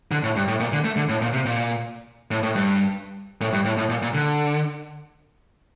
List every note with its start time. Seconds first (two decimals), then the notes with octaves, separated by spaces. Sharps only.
0.11 D3
0.23 A2
0.36 G2
0.48 A2
0.60 A#2
0.73 D3
0.85 A3
0.96 D3
1.09 A2
1.22 A#2
1.34 C3
1.45 A#2
2.31 A2
2.43 A2
2.56 G2
3.41 A2
3.53 G2
3.65 A2
3.77 A2
3.89 A#2
4.02 A#2
4.14 D3